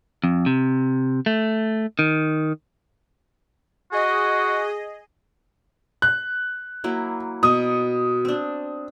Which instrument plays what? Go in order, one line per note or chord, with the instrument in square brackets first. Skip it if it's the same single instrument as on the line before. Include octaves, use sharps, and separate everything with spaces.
[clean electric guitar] F2
C3
A3
D#3
[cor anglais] F#4 [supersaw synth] G#4 D#5
[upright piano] F#6
[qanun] F#3 A#3 E4
[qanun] B2 C#6 [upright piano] D#6
[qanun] C4 D4